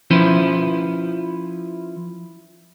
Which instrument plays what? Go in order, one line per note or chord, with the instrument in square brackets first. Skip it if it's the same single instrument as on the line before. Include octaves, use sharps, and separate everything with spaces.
[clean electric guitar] F3 C#4 E4 B4 C5